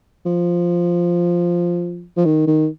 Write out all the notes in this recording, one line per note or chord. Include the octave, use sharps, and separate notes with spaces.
F3
F3
D#3
D#3